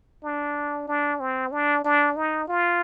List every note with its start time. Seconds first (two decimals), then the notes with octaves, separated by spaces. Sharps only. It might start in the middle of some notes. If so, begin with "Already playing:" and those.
0.24 D4
0.88 D4
1.20 C4
1.52 D4
1.84 D4
2.16 D#4
2.48 F4